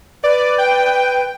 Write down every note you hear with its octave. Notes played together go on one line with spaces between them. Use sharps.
B4 D5
G5